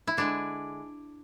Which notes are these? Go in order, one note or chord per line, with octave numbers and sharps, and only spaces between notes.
E4
D3 G#3 D4